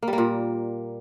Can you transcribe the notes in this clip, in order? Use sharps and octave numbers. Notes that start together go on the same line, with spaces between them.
A#3
G3
A#3
A#2